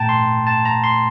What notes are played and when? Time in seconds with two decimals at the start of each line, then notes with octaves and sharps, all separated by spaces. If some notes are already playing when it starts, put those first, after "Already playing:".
Already playing: A#2 A3 G5 A5 A#5
0.09 C6
0.47 A5
0.65 A#5
0.84 C6